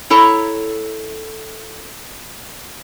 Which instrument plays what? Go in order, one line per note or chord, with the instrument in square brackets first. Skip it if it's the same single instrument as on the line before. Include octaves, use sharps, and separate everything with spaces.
[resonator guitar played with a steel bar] E4 A4 C#5 A#5